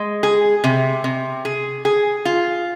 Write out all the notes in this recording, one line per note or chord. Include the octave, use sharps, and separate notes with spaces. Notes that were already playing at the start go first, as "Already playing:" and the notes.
Already playing: G#3
G#4
C3
C3
G#4
G#4
F4